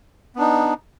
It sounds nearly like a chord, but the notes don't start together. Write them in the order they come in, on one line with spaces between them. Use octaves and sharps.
B3 D4 D#4